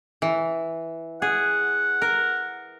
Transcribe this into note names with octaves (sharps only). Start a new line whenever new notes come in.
E3
G#4 F#5
A#4